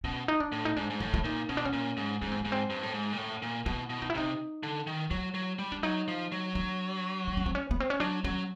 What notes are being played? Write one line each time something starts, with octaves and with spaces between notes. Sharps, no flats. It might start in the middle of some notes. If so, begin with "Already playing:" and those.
B2 C#4
D#4
D4
A2
D#4
G#2 D4
G#2
A2 D#4
E4
A#2 D#4
B2 C#4
D4
C#4
A#2
G#2
G#2 C#4
C4
G#2 B3
C4
G2
A2
G#2
A#2
A2
A#2
B2 E4
B2
D#4
E4
C3 D#4
D3
D#3
F#3 E4
F#3
G3
D4
F#3 D#4
F3
F#3
D4
D4
C#4
C4
C#4
B3
C4
C#4
F#3 D4
F#3 C#4